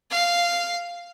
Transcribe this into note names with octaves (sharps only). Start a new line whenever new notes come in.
F5